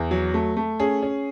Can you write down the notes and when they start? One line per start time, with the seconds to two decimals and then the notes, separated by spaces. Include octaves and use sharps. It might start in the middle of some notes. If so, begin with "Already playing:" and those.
Already playing: E2
0.11 F#3
0.34 A3
0.57 A3
0.80 C#4 G#4
1.03 C#4